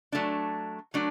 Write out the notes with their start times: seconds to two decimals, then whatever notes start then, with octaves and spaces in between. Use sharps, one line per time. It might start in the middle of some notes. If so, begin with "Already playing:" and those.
0.12 F#3 A3 D4
0.94 F#3 A3 D4